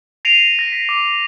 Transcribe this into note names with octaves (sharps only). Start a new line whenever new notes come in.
A#6 C7 D7 D#7 F7
A#6
B6
D6